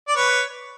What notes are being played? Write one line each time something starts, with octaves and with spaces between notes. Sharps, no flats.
D5
B4 C#5